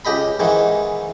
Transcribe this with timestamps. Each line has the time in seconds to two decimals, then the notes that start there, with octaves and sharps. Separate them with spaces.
0.05 C#2 G4 D#5 B5
0.39 G#2 D#3 E3